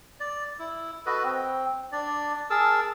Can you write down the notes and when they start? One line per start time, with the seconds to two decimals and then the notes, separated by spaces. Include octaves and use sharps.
0.20 D5
0.59 E4
1.06 F#4 A4 B4 D#5
1.24 C4
1.92 D4 D5
2.50 G#4 A#4 A5 E6